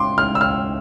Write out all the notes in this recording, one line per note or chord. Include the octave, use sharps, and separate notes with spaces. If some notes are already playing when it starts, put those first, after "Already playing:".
Already playing: C6 D6
F6
E6
F6